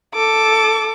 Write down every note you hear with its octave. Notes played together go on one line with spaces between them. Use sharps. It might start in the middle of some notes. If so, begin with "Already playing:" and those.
A4 D6